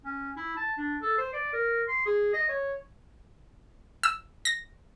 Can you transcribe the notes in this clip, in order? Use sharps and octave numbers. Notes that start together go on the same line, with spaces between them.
C#4
E4
A5
D4
A4
C5
D5
A#4
C6
G#4
D#5
C#5
E6
A#6